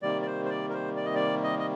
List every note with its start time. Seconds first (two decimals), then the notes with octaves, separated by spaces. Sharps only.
0.02 C3 D#3 G3 A#3 D5
0.22 D5
0.26 C5
0.45 C5
0.50 D5
0.69 A#4
0.74 C5
0.97 D5
1.05 D#5
1.15 D5
1.43 D#5
1.59 D#5